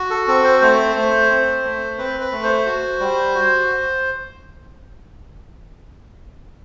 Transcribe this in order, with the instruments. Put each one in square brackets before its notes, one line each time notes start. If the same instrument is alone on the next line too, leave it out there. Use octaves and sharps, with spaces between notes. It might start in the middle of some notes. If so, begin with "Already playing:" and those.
Already playing: [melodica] F#4
A4
C4 A4
C5
A3 C5
A3
C4
A3
C4 B4
B4
A3
C5
F#4
G3
F#4